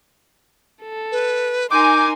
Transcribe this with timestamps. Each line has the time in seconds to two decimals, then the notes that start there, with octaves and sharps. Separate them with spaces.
0.82 A4
1.12 B4
1.71 D#4 A#4 G#5 C6 D6 G6